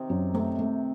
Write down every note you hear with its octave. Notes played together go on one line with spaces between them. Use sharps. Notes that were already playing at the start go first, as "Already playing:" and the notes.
Already playing: C3 D#3
F#2
C3 A3
A3